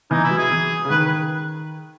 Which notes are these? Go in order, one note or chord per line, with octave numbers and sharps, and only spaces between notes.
E3 D#4
E4
F#3
G#4
E3
C#3
D#3 B4
B4